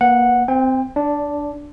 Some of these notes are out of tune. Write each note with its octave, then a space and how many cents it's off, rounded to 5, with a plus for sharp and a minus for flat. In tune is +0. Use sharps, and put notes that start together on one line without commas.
A#3 +15 B4 +0 F#5 -10
C4 -15 G5 +30
D4 +0 D5 -25